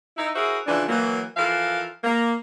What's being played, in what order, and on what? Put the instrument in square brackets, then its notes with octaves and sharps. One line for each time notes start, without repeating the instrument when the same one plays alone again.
[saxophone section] D#4 E4
E4 F#4 G#4 A#4 C5 E5
C#3 E3 F3 A3 D4
E3 F#3 A#3
E3 F3 A4 A#4 F5
A#3